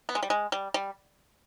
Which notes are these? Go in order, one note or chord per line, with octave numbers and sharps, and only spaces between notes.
B3
G#3
G3
G#3
G3
G3